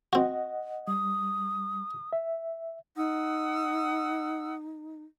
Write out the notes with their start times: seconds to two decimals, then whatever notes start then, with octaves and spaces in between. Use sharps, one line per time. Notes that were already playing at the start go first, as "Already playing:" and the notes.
0.13 C4 F#4 D#5 F#5
0.88 G3 D#6
2.13 E5
2.97 D#4 F#5 D#6 E6